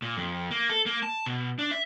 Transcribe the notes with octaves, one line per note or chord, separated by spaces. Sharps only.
A#2
F2
A#3
A4
A#3
A5
B2
D4
E5